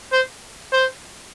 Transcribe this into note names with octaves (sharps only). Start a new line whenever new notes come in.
C5
C5